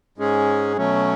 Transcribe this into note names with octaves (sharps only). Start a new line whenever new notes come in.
G#2 G#3 C#4 G#4
B2 F#3 A3 C#4